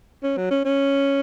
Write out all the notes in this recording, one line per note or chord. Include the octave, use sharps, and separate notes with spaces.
C#4
F#3
C#4
C#4